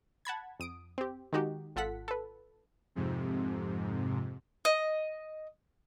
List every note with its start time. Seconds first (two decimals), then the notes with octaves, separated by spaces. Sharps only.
0.25 F#5 A5 B5 G#6
0.60 F2 D#6 D7
0.98 C4 G4
1.33 D#3 G#3 D#4 F#4 G4
1.76 G#1 F4 A4 F#5 B6
2.08 A4 B4
2.95 F2 G#2 C3
4.65 D#5